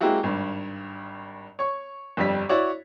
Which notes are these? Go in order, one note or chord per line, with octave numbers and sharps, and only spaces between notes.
G#3 A#3 C4 E4 F#4 G4
G#1 G2
C#5 C#6
G1 F2 G3 B6
E4 F#4 C#5 D5